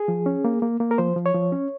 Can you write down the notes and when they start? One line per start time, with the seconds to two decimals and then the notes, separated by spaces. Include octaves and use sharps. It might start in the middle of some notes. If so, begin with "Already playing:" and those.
Already playing: G#4
0.08 F3
0.26 C#4
0.45 A#3
0.62 A#3
0.80 A#3
0.91 A#4
0.98 F3 C5
1.16 F3
1.26 C#5
1.35 F3
1.52 C#4